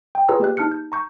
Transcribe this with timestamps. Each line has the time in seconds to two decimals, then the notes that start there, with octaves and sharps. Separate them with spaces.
0.15 G5
0.28 F4 G#4 B4 C#5 A#5 E6
0.40 A#3 G4 D5 F#6
0.57 D#4 A5 F6 F#6 C#7
0.71 G6
0.92 A#5 C#6 G6